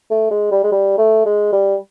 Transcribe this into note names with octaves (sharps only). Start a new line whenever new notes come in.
A3
G#3
G3
G#3
G3
A3
G#3
G3